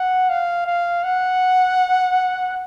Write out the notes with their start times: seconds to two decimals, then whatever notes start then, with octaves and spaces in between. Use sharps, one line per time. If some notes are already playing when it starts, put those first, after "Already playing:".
Already playing: F#5
0.29 F5
0.66 F5
1.04 F#5